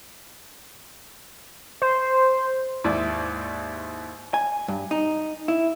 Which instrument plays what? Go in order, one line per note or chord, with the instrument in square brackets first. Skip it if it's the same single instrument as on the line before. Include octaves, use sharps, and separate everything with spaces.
[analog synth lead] C5
[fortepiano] D#2 G#2 E4 D5
[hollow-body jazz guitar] G#5
G2
D#4
E4